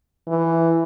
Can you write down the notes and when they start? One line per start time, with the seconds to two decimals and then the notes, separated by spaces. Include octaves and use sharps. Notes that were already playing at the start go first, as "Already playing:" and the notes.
0.28 E3